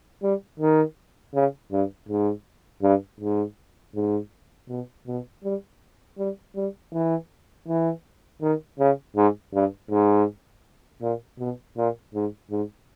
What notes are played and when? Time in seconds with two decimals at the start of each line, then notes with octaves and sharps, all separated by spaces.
0.22 G3
0.59 D#3
1.34 C#3
1.72 G2
2.08 G#2
2.83 G2
3.20 G#2
3.95 G#2
4.69 B2
5.07 B2
5.44 G3
6.18 G3
6.56 G3
6.92 E3
7.68 E3
8.42 D#3
8.79 C#3
9.16 G#2
9.53 G2
9.90 G#2
11.01 A#2
11.39 B2
11.77 A#2
12.14 G#2
12.51 G#2